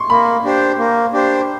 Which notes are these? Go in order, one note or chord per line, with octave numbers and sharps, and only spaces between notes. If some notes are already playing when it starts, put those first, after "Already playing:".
Already playing: C6 C#6
A#3 B5
D4 G4 C5
A#3
D4 G4 C5